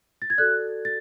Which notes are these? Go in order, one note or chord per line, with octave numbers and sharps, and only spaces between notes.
A6
G#6
F#4 A4 D5 F#6
A6